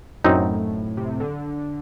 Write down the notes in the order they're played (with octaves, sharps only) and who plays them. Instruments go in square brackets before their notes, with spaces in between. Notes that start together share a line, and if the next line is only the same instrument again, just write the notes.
[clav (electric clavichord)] F#2 F#3 C4 D#4 [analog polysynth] A2
[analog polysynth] C3
D3